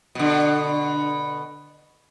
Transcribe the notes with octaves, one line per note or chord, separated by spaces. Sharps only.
B2 D3